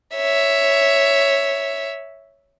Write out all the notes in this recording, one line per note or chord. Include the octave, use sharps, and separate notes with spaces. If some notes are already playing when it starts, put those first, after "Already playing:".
C#5 E5